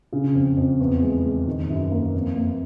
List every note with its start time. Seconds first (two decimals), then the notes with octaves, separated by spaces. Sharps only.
0.13 C#3
0.35 F2
0.57 F2
0.80 E2
1.03 G#3
1.24 G#3
1.47 D#3
1.70 F#2
1.91 A#3
2.14 F2
2.36 A#3